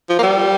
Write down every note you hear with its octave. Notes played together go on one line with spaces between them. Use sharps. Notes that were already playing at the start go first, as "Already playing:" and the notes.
F3
A#3
G3